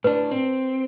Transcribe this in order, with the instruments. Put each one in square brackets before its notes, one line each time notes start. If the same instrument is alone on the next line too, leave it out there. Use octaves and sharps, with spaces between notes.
[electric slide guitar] A2 D4 [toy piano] B4
[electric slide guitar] C4